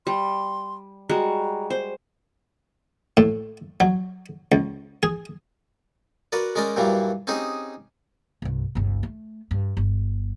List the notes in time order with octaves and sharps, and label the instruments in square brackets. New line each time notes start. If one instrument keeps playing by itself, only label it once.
[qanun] G3 [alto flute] C6
[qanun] G3 G#3 F#4 [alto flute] A#5
[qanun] C5
[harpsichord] A2
F#3
C#2
G#4
F#4 A#4 B4 D5
G#3 C#4 A#4 D5 G5
G2 A#2 E3 F#3 G3
C4 C#4 D#4 G4 G#4
[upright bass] C2 G2
G1 C#2
A3
G2
G1